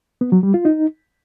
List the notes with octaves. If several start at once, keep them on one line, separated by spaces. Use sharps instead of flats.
B3
F#3
G3
F4
D#4